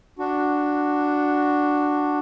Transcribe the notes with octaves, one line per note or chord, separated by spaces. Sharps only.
D4 F#4